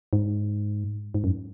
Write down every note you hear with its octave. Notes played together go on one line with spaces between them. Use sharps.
G#2
G#2
F#2